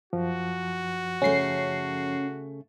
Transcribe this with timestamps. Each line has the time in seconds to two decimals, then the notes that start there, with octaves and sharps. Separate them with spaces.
0.13 F#2 F3 F#4
1.22 C#3 A3 C#4 C7